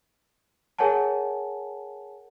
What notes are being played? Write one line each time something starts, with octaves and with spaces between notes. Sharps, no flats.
G#4 A#4 C#5 F#5 G#5 A5